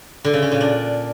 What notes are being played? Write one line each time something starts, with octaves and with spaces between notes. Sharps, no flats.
D3
C#3
C#4
A#2
D4